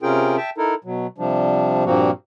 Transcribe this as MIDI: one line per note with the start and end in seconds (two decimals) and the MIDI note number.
0.03 0.37 48
0.03 0.37 61
0.03 0.37 65
0.03 0.37 68
0.03 0.37 70
0.03 0.37 79
0.37 0.50 76
0.37 0.50 79
0.37 0.50 81
0.58 0.74 63
0.58 0.74 64
0.58 0.74 69
0.58 0.74 70
0.84 1.07 47
0.84 1.07 54
1.18 1.84 48
1.18 1.84 53
1.18 1.84 55
1.18 1.84 62
1.85 2.11 43
1.85 2.11 46
1.85 2.11 53
1.85 2.11 58
1.85 2.11 60
1.85 2.11 66